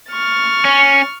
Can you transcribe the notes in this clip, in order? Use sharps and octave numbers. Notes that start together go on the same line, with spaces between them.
C#6 F6 A6
C#4